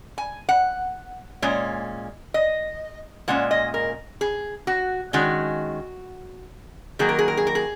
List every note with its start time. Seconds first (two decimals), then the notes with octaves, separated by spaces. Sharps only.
0.18 G#5
0.49 F#5
1.42 A#2 G#3 C#4
2.34 D#5
3.28 A#2 G#3 C#4 F#5
3.51 D#5
3.74 A#4
4.21 G#4
4.67 F#4
5.13 D#3 G#3 C#4 F#4
6.99 D#3 F#3 A#3 G#4
7.09 A#4
7.19 G#4
7.28 A#4
7.37 G#4
7.47 A#4
7.55 G#4